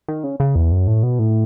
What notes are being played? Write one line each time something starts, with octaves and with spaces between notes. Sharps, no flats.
D#3
C#3
C#3
E2
F#2
A2
B2
A2